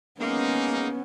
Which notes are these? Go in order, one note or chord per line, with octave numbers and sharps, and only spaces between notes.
G#3 A#3 B3 C#4 D#4